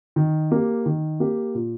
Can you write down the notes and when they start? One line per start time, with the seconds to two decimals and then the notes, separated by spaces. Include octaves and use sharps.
0.16 D#3
0.51 A#3 G4
0.86 D#3
1.20 A#3 G4
1.55 A#2